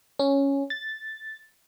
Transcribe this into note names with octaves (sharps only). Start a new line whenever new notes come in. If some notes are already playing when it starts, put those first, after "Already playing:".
C#4
A6